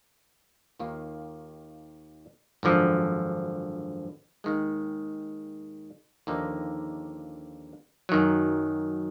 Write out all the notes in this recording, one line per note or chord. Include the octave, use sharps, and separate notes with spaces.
D#2 D#3 A#3 F4
G#1 F#2 D3 F3
D#2 D#3 G#3
D#2 D3 F3 A#3 D#4
F#2 D#3 F#3